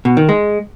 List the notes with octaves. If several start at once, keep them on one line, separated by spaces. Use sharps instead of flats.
B2
D#3
G#3